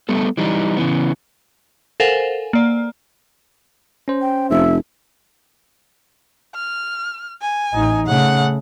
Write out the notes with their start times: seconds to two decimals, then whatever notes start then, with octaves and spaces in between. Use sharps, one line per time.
0.09 G3 A3 B3 A4
0.37 E3 G3 D#4
0.77 C#3 E3 B3
2.00 A4 A#4 C5 F5 F#5 G#5
2.53 A#3 D5
4.08 C#4 C5
4.21 G5
4.50 F1 E5
6.55 F6
7.42 G#5
7.73 A1 D#4
8.07 C#3 A3 F#5